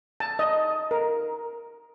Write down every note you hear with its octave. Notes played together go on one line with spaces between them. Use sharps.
A5
D#5
A#4